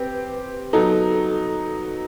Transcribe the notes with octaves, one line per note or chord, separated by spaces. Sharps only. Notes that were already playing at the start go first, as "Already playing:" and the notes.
Already playing: C4 G4 B4
F#3 B3 D#4 A4